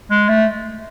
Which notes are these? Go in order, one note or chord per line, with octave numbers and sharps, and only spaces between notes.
G#3
A3